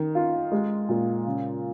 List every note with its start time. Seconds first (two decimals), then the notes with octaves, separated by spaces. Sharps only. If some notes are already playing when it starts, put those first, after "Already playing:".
Already playing: D#3
0.15 F4
0.52 G#3
0.89 A#2
1.26 C#3